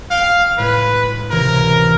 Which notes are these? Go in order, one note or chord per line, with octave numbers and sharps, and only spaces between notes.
F5 G5
A2 G#3 B4
C#2 C3 E3 A#4